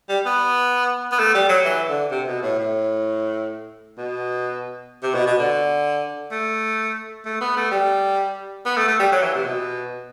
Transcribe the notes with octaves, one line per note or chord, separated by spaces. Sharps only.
G3
B3
B3
A3
G3
F#3
E3
D3
C3
B2
A2
A2
B2
C3
B2
B2
D3
A3
A3
B3
A3
G3
B3
A3
A3
G3
F#3
E3
C3
B2